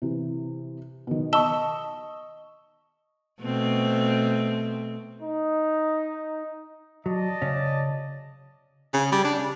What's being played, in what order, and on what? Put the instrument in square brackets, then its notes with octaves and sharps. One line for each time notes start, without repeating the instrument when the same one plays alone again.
[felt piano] C3 E3
B2 D#3
[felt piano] D#5 C#6 [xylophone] A5 E6 G7
[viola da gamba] B2 A3 C4
[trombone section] D#4
[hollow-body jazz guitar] F#3 [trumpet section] D5 D#5 A5
[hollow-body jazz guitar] C#3 C#4
[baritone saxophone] C#3
G3
D4
C#3